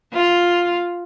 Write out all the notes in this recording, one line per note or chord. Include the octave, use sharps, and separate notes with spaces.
F4